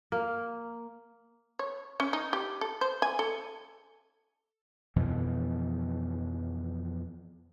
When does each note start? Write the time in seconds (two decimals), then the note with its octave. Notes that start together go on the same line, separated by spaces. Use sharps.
0.12 A#3
1.59 C#5
2.00 C#4
2.13 D#4
2.33 G4
2.61 A4
2.81 C5
3.02 G#5
3.19 A4
4.96 F2 B2 E3 F3